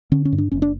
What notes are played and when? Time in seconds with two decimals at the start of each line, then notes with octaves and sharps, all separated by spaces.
0.12 D3 C#4
0.25 C#4
0.33 G2
0.38 D4
0.52 F#1 C#4
0.62 D4